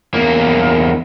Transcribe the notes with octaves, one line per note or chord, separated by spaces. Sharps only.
E2 A#3